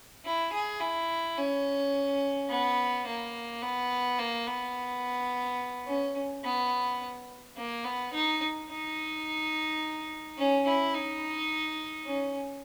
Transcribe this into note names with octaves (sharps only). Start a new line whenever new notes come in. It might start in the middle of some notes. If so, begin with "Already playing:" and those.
E4
G#4
E4
C#4
B3
A#3
B3
A#3
B3
C#4
B3
A#3
B3
D#4
D#4
C#4
E4
D#4
C#4